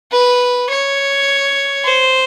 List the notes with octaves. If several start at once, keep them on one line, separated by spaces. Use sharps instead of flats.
B4
C#5
C5